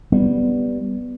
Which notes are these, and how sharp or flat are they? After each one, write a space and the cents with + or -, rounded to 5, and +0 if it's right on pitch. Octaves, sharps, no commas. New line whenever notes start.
G3 +0 B3 +0